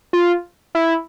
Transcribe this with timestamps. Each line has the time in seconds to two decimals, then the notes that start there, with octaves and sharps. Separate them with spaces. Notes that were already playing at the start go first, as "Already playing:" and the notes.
0.13 F4
0.75 E4